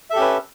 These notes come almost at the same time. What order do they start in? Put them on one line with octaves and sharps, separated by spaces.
E5 A4 G4 C#4 B4